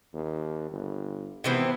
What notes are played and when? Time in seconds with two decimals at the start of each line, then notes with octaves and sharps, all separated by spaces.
0.14 D#2
0.71 G1
1.44 G#1 C3 E3 B3 C4 E4